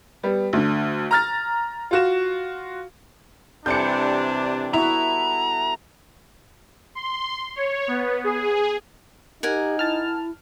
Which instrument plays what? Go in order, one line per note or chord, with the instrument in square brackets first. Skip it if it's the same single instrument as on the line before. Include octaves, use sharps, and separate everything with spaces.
[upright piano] G3 B3
D2 D3
A#5 F6 A6
F4 F#4 E7
[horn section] C3 D4 [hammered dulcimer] E3 G3 A4 [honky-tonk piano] G6 C#7
[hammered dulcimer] B3 F#4 [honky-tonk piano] E4 [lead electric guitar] A#5
[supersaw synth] C6
C#5
B3
G#4
[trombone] D#4 [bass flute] G4 [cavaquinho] A#4 F#5 G#5
[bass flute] E4 [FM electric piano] A5 F6